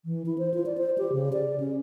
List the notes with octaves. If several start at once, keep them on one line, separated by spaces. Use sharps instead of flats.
E3
E4
C5
F4
D5
C5
G4
C#3
D5
C#4